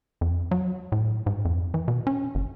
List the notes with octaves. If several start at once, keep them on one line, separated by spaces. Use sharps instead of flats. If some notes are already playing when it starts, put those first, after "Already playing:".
F2
F#3
A2
G#2
F2
E3
B2
C#4
G1